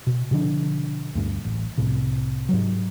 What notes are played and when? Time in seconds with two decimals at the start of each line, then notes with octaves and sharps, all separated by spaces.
0.07 B2
0.31 B2 D3 F3 D4
1.15 D2 G2
1.45 A1
1.78 C2 A2 C3
2.49 G#2 F#3